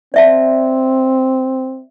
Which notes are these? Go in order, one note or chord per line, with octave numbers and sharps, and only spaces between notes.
C4 D5 E5 A5